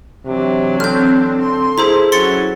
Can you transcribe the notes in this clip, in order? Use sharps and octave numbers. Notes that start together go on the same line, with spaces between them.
C3 E3 F#3 D4
C4 A4 F6 G6
D3 C6
E4 G#4 C5 A#5
F#3 C#4 F#4 C6 A6 C#7